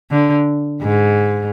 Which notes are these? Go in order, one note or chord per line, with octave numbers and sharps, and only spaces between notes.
D3
G#2